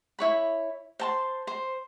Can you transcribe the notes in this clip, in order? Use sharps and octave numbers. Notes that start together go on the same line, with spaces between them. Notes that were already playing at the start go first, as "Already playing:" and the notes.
E4 C#5 B5
C5 A5 C6
C5